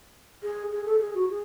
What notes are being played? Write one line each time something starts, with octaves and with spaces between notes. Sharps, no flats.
G#4
G#4
A4
G#4
F#4
G#4